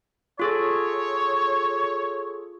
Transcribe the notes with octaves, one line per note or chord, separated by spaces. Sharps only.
F4 G#4 A4 C#5